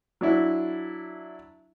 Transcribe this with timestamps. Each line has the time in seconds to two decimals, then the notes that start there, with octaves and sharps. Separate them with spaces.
0.21 F#3 D4 E4